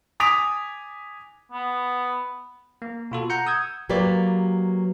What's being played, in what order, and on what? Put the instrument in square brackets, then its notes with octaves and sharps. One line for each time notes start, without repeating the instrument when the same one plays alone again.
[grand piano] G#5 D6 D#6 B6 D7 F7
[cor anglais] B3
[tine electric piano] A#3
B2 F4 A4
F#5 A#5 G6 C#7
D#6 E6 G6 G#6
[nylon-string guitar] F#3 A#3 G4 B4 D5